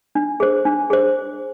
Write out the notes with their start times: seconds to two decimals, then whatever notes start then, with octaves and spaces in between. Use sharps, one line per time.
0.15 D4
0.40 G#4 C5
0.65 D4
0.90 G#4 C5